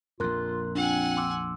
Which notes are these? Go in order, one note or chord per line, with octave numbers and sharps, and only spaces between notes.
A#1 F2 F4 A#4 C6 F#6
C4 D4 F4 F#5 G#5
C6 D6 E6